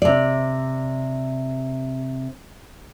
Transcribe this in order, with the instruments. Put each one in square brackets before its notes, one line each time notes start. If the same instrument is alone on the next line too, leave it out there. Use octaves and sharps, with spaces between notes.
[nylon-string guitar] C3 D5